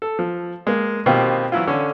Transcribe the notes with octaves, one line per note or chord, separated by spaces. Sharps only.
A4
F3
G#3 A#3
B2 D#3 A#3 C4 F4 G4
E3 F#3 E4 F4
D3 C#4